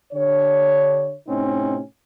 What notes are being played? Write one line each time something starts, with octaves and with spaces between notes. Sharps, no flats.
D3 D4 G4 C#5
A2 C3 C4 C#4 D#4